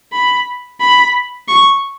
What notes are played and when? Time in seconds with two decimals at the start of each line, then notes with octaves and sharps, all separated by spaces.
0.12 B5
0.81 B5
1.48 C#6